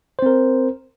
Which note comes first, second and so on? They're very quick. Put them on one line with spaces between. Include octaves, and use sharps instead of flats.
C5 C4 A#4